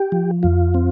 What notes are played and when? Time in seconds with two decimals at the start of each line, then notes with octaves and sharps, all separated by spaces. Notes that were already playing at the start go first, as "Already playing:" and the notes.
Already playing: G4
0.12 F3
0.43 F2 F4
0.74 C4